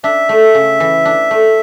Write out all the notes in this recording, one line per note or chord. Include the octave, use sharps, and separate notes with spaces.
D4 E5
A3
C#3
E3
D4
A3